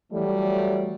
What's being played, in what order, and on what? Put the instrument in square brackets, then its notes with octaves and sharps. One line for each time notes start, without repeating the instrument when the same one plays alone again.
[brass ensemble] E3 F#3 G3 A3